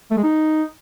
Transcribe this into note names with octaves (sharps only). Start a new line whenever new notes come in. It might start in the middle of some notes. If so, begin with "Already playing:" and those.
A3
G#3
D#4